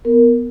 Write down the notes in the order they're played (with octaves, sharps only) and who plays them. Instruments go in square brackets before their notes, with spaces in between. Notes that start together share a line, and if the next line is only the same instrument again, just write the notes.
[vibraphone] B3 A#4